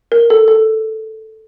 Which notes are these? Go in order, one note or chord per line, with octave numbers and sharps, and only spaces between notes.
A#4
A4
A4